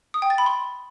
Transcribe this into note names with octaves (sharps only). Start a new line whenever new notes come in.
D#6
G5
A6
B5
C6